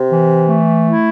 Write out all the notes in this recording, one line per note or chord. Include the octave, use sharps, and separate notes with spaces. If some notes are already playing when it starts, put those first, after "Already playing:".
Already playing: C3
E3
A3
E4